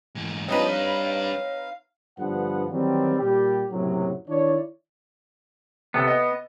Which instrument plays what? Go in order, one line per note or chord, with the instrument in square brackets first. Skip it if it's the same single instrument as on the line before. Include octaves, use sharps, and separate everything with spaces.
[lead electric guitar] G#2 E3
[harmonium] F3 D#5 [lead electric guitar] G3 D4 [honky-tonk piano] C4 D#4 B4 [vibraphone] C#5
[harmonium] F5
[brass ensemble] G2 D3 F3 B3 F#5
D#3 E3 F#3 G3 C4
A#2 G3 G4
F#1 A2 C3 F#3
D#3 D4 E4 C#5 D5
[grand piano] C3 A4 [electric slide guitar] B3
[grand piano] D#5